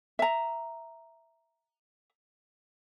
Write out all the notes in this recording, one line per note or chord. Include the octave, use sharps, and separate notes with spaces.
E5 A#5